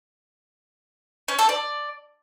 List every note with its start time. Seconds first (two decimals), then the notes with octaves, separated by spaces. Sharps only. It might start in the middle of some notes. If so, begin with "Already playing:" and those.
1.28 C#4
1.39 A4
1.49 D5